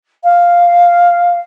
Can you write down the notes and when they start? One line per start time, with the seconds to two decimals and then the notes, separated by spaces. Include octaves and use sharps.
0.24 F5